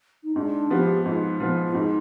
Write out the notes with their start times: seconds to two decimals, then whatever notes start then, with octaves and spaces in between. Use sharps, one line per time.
0.24 D#4
0.35 G#2 D4
0.70 F3 B3 G4
1.05 G#2 F4
1.40 F3 B3
1.65 F4
1.75 G#2 D#4